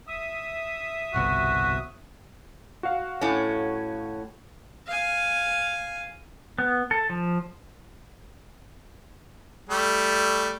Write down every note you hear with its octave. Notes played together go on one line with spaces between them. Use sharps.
E5 D#6
G1 C2 B2 F#4
F#4 F5
A2 C#4
F5 G#5
B3
A4
F3
G3 A3